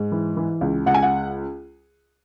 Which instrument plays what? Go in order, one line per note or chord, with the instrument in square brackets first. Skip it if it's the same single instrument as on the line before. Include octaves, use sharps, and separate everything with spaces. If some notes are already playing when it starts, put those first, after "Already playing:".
Already playing: [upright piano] G#2
E3
E3
C#2
C#2 F#5
G#5
F#5